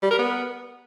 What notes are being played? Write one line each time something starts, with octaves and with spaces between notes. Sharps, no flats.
G3
A#4
B3